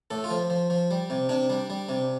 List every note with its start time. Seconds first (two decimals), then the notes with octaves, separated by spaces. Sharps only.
0.10 A2 A4
0.24 F4
0.30 F3
0.50 F3
0.70 F3
0.91 G3
1.10 C3
1.29 C3 D4
1.50 G3
1.70 G3
1.89 C3